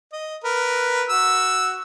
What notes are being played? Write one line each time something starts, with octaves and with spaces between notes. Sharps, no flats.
D#5
A#4 B4
F#4 E6